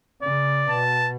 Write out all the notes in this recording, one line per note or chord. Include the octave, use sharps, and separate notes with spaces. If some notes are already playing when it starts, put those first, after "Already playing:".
C#3 D5
B2 A5